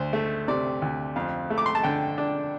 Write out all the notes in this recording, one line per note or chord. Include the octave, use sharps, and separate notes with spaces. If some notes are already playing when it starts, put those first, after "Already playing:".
Already playing: D2 C5
A3
C3 D5
D2
F2 F5
A3
D6
C6
A5
D3 G5
D4